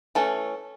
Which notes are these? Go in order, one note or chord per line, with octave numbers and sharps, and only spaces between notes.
E3 A3 C#4 A4